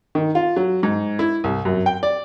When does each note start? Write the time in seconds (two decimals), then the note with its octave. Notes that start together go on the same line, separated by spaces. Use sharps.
0.15 D#3
0.35 F4
0.56 F#3
0.83 G#2
1.19 E4
1.44 C2
1.65 F#2
1.86 G5
2.03 D5